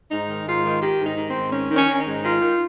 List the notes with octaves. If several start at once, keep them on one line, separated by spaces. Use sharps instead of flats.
G#2 D#4
D#3
G#2 F4
D#3
D#3 G4
G#2
D#4
D#3
C4
G#2
D#3 C#4
D#3
C#4
D#3
C#4
D#4
G#2
D#3 F4
D#3